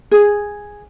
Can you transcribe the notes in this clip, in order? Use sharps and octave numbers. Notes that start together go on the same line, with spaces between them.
G#4